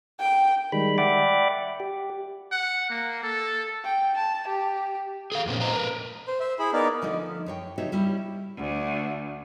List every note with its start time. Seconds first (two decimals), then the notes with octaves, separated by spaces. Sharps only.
0.20 G5
0.72 D#3 G3 G#3 B5
0.98 D5 E5 F#5 G5 B5 D6
1.80 G4
2.52 F#5
2.90 A#3
3.23 A4
3.84 G5
4.17 A5
4.47 G4
5.32 G#4 A4 F5
5.46 F2 A#2 B3 C#4
5.59 A#2 B4 C5 D#5 A#5
5.73 A#4 B4
6.27 C5
6.40 C5 E5
6.59 E4 G#4 B5
6.73 B3 D#4 A#4 D5
7.02 D2 F3 A3 D#4
7.46 F#2 C#5 G5
7.78 C#3 F#3 D#4 G4 C#5 E5
7.92 G3 C#4 E4 G4
8.56 D2